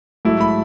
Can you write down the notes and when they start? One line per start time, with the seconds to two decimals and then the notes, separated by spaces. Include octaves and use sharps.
0.25 G#2 F#3 A3 E4
0.41 B5